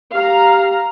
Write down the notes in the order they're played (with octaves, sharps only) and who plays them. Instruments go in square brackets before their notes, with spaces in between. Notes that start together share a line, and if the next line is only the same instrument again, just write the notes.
[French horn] G4 [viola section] F5 A#5